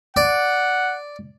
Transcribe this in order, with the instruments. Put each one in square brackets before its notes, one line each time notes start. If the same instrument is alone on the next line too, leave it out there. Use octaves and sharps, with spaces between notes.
[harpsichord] D5 [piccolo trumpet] F#5